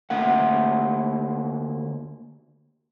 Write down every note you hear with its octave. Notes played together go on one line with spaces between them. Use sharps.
D2 A#3 A#4 F#5